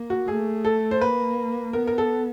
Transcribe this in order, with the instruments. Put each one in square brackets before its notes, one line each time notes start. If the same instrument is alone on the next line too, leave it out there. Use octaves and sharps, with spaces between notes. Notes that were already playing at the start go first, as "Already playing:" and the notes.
Already playing: [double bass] A#3
[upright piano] F#4
[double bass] A3 [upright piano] G#4
[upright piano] A4
C5
[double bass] A#3 [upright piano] B4
[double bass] B3 [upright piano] A#4
[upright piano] A#4
A4